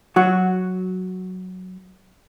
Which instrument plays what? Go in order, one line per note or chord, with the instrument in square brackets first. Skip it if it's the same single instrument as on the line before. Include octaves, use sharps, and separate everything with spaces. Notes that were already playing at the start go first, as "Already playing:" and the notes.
[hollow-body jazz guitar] F#3 F#4